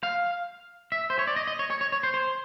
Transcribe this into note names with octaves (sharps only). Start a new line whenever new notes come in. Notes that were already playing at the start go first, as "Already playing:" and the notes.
F5
E5
C5
C#5
D5
D#5
D#5
C#5
C#5
C#5
C#5
C5
C5